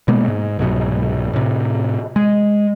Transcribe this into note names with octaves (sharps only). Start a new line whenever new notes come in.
B2 G#3 A#3 B3
G#2
C2 G#2 B2 F#3
A2 C3
G#3